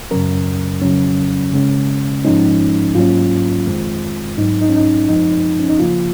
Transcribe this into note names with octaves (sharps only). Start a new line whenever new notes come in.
F#2 C#3 F#3 C#4 A#4
F2 C#3 F#3 C#4
C#3 G#3 C#4
G#2 F3 G#3 C#4 D#4
G#2 F#3 A#3 C#4 F4
F2 D#3 G#3 C4
G#2 F#3 C4 D#4
D#4
C#4
D#4
F#2 F3 G#3 C4 D#4
C#4
D#4
C#3 F3 A#3 F4